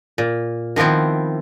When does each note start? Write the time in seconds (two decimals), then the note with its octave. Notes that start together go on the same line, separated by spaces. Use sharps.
0.18 A#2
0.76 D#3 F3 B3 C4 E4